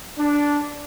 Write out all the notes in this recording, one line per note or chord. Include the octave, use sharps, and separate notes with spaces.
D4